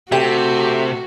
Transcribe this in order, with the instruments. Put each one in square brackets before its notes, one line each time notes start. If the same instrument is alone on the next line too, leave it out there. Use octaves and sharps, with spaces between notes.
[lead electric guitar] C3 [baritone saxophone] A3 [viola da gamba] F#4 [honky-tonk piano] G4